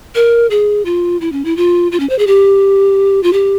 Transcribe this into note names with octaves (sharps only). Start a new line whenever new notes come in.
A#4
G#4
F4
E4
C#4
E4
F4
F4
C#4
C5
G#4
G4
F4
G4